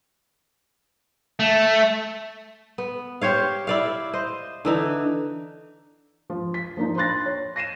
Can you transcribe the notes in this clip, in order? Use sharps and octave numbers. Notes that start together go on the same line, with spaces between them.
A3
B3
G4 C5 C#5 F5
E4 D5 F5
C5 D#5
D3 E3 D#4
F3
B6
F3 A#3 D4 D#4
C5 B5 C6 F#6 A6 A#6
C#5
A#6 C7 D#7 E7